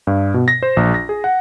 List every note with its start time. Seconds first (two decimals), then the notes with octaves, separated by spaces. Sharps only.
0.07 G2
0.34 B2
0.48 A#6
0.63 C5
0.77 A#1
0.94 A#6
1.09 G#4
1.24 F#5